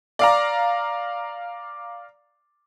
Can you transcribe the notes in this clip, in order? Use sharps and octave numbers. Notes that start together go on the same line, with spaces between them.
D5 F5 A#5